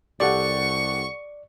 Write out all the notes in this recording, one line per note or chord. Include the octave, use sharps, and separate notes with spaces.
C2 G4 A4 D5 F#5 C#6